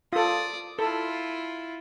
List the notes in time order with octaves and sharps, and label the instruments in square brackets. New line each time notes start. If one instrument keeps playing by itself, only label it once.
[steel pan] F4 A4 [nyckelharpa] D5 D#6
[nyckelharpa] E4 F4 [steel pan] A4